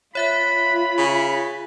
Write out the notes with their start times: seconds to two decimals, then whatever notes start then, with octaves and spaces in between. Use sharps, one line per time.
0.15 F4 C#5 E5 B5 F#6
0.98 C#3